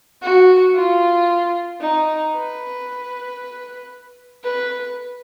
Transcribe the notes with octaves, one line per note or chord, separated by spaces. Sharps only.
F#4
F4
D#4
B4
B4